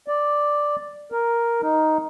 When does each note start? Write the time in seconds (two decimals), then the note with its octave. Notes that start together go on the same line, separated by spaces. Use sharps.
0.08 D5
1.12 A#4
1.62 D#4